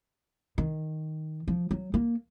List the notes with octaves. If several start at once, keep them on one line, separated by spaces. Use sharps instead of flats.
D#3
F3
F#3
A#3